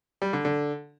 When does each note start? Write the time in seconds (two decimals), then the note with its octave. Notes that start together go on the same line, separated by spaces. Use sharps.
0.22 G3
0.33 D3
0.45 D3